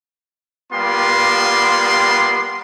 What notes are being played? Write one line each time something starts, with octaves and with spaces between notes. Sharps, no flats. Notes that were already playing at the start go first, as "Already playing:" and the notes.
G3 A#3 B3 F4 G4 C6